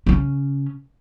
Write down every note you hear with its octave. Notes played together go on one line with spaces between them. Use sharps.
C#3 C#4